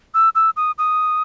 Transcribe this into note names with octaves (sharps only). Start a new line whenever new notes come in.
E6
E6
D#6
D#6